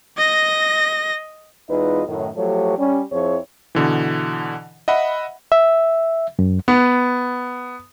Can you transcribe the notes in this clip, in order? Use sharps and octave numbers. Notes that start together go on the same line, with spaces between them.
D#5 A#6
E2 G#3 D#4 F4 B4 D#5
F#2 A2 D#3
F3 F#3 A3 G4 A4 C#5
G3 C#4
F2 F3 C4 E4 G#4 C#5
B2 D3 E3
D#5 E5 F#5 B5
E5
F#2
B3